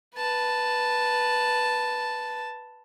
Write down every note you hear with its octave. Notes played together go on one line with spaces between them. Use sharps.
B4 A5